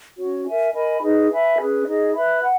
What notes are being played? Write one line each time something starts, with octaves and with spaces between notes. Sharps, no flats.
C#4 F#4 C#5
A#4 E5 G#5
A#4 D#5 G#5 B5
D#4 G#4 B4 D#5
B4 E5 G#5 B5
C#4 G#4 B4
D#4 G#4 D#5
B4 E5 B5
F#5